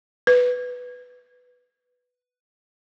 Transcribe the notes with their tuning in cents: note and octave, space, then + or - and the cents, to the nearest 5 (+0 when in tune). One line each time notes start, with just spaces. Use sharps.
B4 +5